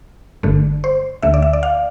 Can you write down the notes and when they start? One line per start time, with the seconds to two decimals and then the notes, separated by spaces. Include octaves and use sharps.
0.43 G1 G2 D3 A3
0.84 C5
1.22 D2 D3 A3 E5
1.34 D5
1.42 E5
1.53 D5
1.63 F5